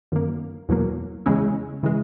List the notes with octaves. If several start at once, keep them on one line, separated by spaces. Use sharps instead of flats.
F#2 D#3 A#3
E2 B2 F#3 A#3
E2 C#3 G#3 C#4 E4
C#3 E3 G#3